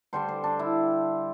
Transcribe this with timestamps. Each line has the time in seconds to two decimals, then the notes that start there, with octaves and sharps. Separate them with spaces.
0.13 D3 G3 D4 C5
0.28 C5
0.44 D4
0.59 E4